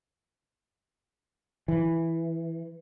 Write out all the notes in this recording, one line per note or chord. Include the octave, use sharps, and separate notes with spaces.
E3